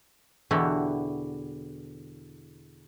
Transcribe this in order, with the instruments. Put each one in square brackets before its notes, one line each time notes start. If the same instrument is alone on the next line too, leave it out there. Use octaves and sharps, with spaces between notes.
[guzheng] E2 B2 D3 E4 F#4 G4